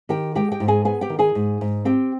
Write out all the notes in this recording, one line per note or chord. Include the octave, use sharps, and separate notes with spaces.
D#3 G4 G5
G#3 G4 G5
G4 G5
G#2
G#4 G#5
B3 G#4 G#5
G4 G5
D#3
G#4 G#5
G#2
G#2
C4 G4 G5